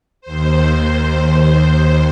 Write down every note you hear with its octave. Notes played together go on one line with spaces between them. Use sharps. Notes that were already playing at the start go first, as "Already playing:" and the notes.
D#2 C5